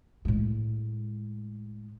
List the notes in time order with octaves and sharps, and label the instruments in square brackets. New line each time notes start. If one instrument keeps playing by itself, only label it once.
[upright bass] A2 G#3